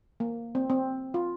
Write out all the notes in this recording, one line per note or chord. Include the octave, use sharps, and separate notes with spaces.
A#3
C4
C4
F4